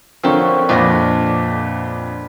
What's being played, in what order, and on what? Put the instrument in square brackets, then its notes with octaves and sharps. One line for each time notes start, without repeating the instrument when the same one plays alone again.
[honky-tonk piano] D3 F3 [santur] C4 C#5 [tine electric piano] A#4 C5 F5
[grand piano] F2 A#2 [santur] D4 B4 [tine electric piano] D#5 A#6